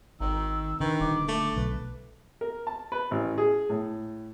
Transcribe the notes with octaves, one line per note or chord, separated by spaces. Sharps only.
G#1 D#3 E6
D3 D#3 B4
D#1 D6
A3
B1 B4
A#4
A5
B4
A1
G#4
A2